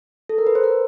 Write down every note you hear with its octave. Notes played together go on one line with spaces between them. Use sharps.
A4
A#4
B4
C5
A#4